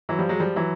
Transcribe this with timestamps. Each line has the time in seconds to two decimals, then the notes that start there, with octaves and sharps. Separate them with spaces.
0.09 E3 F#3
0.19 F3 G3
0.29 F#3 G#3
0.40 F3 G3
0.56 E3 F#3